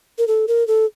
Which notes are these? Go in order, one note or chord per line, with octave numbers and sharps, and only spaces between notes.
A#4
A4
A#4
A4